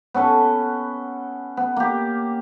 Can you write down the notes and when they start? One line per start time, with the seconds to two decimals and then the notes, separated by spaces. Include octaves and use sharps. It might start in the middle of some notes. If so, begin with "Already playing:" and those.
0.14 B3 C#4 A4 B4
1.57 B3
1.76 A#3 G4